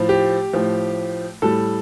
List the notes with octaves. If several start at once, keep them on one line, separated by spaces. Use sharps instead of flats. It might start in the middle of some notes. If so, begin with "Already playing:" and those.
Already playing: A2 F3
G4
A2 F3
A2 G3 A4